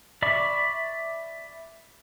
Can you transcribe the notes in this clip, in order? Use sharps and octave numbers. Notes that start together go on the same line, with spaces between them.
D5 E5 B5 C#6 D6